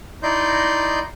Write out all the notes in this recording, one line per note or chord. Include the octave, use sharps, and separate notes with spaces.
D#4 E4 D5 D#5 C6 G6